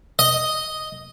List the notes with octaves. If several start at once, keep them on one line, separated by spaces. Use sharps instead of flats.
D#5